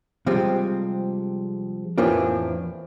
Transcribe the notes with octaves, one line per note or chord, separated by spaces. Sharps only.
C3 F3 G3 G#3 C4
F2 A2 E3 F3 A#3 D4